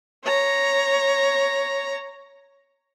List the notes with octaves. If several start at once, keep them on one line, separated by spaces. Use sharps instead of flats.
C#5 A#5